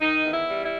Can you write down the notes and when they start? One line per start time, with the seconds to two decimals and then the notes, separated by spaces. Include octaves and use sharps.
0.01 D#3 D#4
0.24 E2
0.32 E4
0.48 G3
0.63 E4